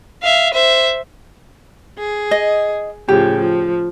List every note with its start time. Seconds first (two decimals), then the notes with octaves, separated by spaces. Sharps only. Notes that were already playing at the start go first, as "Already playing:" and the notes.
0.23 E5 F5
0.54 C5 E5
1.99 G#4
2.31 D#5
3.08 A2 C#3 F3 G4
3.39 F3